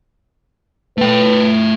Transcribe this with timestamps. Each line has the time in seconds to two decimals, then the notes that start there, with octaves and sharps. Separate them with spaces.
0.98 A3 B4 G5